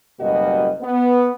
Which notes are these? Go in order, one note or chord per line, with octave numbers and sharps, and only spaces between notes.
F#1 B2 G3 A#3 F#4 D#5
B3